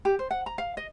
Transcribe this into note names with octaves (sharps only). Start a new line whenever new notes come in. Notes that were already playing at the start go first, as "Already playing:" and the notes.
G4
C5
F#5
A#5
F5
D#5